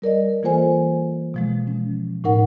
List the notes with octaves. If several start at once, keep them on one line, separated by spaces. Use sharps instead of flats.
G3 A#4 D5 D#5
E3 A#3 F4 A4 C5 G#5
B2 F3 G#3
C#4
A2 D#4 A#4 F#5